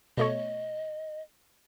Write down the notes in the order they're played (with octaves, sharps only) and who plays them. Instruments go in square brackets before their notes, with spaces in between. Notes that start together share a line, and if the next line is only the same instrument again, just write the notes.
[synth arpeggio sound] B2 A3 C#5 [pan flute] D#5